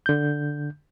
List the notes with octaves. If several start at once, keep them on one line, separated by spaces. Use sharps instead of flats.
D3 G6